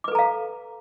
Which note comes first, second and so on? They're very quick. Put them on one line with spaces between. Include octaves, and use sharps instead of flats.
D6 B4 A4 A#5 F5